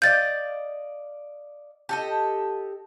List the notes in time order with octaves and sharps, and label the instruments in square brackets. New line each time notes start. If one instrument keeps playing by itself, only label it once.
[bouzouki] D5 D#5 F5 [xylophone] G6 A6
[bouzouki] G4 A4 D#5